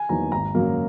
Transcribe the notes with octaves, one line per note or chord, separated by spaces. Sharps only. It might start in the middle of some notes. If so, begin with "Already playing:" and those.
Already playing: G#5
E2 D#3 F#3 A#3 A#5
G#1 A#5
F#2 C#3 F#3 A#3